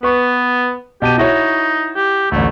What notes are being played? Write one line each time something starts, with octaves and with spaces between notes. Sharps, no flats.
B3 B4 C#6
B2 G4 A5 D#7
D#4 E4 F#4 C#5
G4
A1 D2 A3